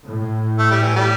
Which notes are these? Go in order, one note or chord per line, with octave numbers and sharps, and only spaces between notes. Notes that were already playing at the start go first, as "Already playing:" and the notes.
A2
A3
G3
E3
G3